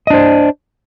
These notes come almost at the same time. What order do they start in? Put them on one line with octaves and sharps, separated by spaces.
D#5 D4 C5